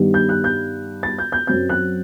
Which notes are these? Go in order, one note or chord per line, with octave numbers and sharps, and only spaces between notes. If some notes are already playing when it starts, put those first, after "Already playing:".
Already playing: G2 D#3 G3 B3
G6
F#6
G6
A6
G6
G6
F#2 F#3 C4 G6
F#6